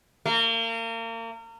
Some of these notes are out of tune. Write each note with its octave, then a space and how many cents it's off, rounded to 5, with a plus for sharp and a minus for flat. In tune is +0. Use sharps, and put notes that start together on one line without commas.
A#3 -35